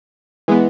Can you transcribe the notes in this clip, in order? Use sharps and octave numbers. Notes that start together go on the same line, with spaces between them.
E3 G#3 B3